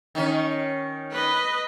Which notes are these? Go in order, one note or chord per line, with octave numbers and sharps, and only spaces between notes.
D#3 C#4
B4 D#5